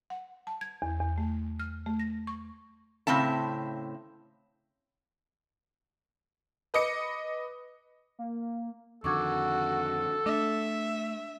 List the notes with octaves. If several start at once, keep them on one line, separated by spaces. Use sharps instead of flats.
F#5
A5
G#6
E2
E2
A3
F6
A3
A#6
C#6
A2 C#3 C4 E5 A5
B4 D#5 D6 C#7
A#3
F2 D3 D#3 F#4 A4 C#6 D6 G#6
A3 D4 E5